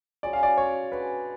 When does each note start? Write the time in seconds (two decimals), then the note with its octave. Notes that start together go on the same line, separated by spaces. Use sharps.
0.23 F#3 C#4 F4 G#4 D5
0.33 F5
0.43 D5
0.57 C#5
0.92 G#3 D4 F#4 B4 C#5